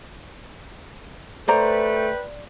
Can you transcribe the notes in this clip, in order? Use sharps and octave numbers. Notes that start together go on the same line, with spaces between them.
A3 B4 C5 D5 G5 A#5